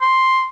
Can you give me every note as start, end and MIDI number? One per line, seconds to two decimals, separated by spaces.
0.01 0.48 84